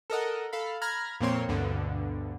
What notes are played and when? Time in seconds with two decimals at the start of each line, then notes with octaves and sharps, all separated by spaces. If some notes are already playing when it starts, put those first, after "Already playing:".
0.10 A4 A#4 D#5 F#5
0.53 A4 F5 B5
0.82 A#5 B5 F6 G#6 A#6
1.20 F2 A#2 A#3 C4 C#5 C6
1.48 D2 G2 B2 D3